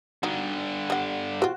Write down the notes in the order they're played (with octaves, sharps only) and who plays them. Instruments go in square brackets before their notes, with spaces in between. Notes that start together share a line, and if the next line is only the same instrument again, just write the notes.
[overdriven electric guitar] G2 D3 [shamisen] D#4 F#4
[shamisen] G3 F#5
[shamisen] C4 F4 [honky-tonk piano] F#4